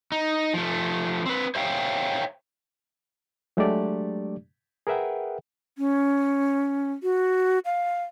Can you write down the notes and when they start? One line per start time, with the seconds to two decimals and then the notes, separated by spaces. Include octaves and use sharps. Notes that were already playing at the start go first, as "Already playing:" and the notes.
0.12 D#4
0.54 F3 A3
1.26 C4 B4
1.55 C5 C#5 E5 F5 G5
3.57 F#3 G#3 A3 D4 G4 D5
4.87 G#4 A#4 B4 E5 F#5 G5
5.78 C#4
7.03 F#4
7.65 F5